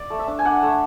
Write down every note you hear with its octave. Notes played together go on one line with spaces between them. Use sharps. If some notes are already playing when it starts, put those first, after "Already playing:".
Already playing: D5
A3
E5
D4
G#5
D4 F#5
A3